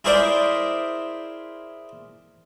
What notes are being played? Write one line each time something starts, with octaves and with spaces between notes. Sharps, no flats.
E4 G#4 A#4 C5 D5 E5